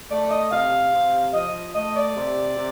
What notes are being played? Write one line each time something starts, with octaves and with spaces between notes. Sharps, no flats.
A3 D5
D#5
C3 F5
C3
F3 D#5
A3 D#5
D5
C3
C3